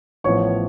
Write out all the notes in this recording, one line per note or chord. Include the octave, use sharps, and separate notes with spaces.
A1 A2 F3 B3 C#5 C#6